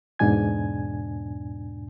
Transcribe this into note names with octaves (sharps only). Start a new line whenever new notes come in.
E2 G#2 B2 D4 G#5 G#6